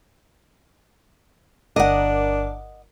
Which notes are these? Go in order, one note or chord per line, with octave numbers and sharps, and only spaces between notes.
G1 D4 A#4 D#5 F#5 D6